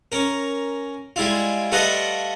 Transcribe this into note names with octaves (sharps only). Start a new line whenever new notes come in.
C#4 A#4
G3 G#3 E4 F4
G3 A3 F4 B4 D#5 F#5